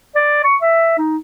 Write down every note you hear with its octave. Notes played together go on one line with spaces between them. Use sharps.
D5
C#6
E5
D#4